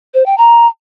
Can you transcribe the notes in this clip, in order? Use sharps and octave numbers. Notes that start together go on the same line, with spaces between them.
C5
G5
A#5